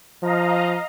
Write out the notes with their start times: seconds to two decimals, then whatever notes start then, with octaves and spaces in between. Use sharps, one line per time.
0.23 F3 D#5 F5 A#5